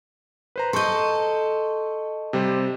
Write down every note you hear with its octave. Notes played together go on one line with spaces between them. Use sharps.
B4 C5 A#5
A4 D#5 C6 C#6 G6
C3 G3 C5